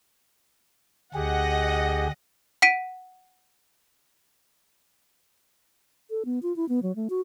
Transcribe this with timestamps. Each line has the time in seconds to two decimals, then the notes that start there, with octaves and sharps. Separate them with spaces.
1.14 D2 G4 G#4 D#5 F#5
2.62 F#5 B6 D7 D#7
6.10 A4
6.25 B3
6.42 F4
6.56 E4
6.69 B3
6.83 F#3
6.96 A3
7.10 F#4